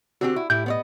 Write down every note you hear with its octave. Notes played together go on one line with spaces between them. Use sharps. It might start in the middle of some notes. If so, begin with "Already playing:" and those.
D3 C4 F#4 G4
E4
A2 E4 G4 G6
B3 C#5 D#5